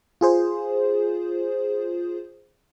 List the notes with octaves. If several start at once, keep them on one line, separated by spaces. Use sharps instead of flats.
F4 G#4 C5